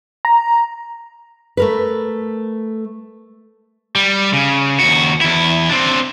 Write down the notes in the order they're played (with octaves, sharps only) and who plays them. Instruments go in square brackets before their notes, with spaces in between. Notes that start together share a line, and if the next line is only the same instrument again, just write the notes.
[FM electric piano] A#5
[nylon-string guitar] A3 A#4 B4
[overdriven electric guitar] G3
C#3
D#2 F#4
E2 E4
C4 D4